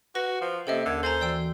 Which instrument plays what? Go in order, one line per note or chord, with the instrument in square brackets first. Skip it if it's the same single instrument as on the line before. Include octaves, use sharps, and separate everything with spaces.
[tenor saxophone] F#4 [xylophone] B4 A#6
[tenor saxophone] F3
[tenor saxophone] C3 [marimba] A#3 C#4 [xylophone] A4 D#5 E5
[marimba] D#2 A#4 G#6 [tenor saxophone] D3
[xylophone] A4 G#5 A#5 [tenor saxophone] C5
[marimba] E3 F#4 [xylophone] D5 G5 E6